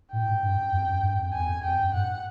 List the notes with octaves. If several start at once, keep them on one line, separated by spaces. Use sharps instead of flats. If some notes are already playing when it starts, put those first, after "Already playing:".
A2 G5
G#2
G2
F#2
F2
F#2
G2
F2
E2 G#5
F2
F2 G5
F#2
G#2 F#5